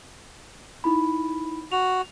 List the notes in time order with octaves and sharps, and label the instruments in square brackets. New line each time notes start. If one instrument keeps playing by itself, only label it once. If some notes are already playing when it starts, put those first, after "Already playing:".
[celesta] D#4 E4 B5
[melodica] F#4 [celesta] F7